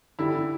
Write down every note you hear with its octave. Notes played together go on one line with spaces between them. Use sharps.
D3 G3 E4